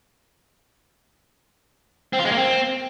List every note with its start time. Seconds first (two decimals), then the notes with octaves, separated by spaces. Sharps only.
2.13 C4
2.19 F4
2.25 G#3
2.31 A#3
2.37 C4